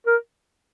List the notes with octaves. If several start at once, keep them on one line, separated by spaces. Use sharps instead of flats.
A#4